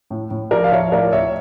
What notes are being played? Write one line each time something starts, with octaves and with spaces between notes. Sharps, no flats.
A2
A2
F3 A#4 D5
F5
F3 C#5 E5
A2 A#4 D5
A2 C#5 E5